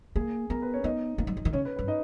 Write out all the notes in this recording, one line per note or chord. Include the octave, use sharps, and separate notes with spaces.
A#3 G#4 G#5
B3 A#4 A#5
B4
C#4 C#5
B3 D#4 D#5
A#3
G3
E3
D#3
C#3 C#4 C#5
B4
G2 B4
D#4 D#5